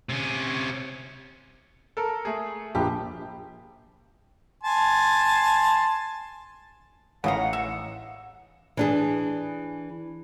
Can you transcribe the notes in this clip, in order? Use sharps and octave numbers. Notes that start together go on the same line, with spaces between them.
C3 C#4
A4 A#4
A3 G#4
A#1 G4
G#5 A5 C6
A1 C#3 D#5 F5 F#5 A#5
E5
E3 D4 G#4